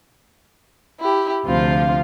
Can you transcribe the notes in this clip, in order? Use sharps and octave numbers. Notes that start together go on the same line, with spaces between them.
E4 G4
D2 C3 F3 F4 F5